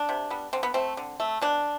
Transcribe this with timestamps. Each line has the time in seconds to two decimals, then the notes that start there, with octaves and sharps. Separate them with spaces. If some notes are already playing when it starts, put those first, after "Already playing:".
Already playing: D4
0.09 C3
0.30 G3 B3
0.53 D3 C4
0.63 B3
0.74 A3 C4
0.97 D3
1.20 A3
1.41 B2 D4